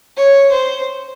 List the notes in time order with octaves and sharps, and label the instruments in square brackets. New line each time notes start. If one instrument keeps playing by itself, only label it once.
[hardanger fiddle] C#5
C5